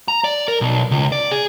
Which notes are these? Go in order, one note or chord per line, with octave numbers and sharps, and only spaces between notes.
A#5
D5
A#4
B1
C#2
D5
G#4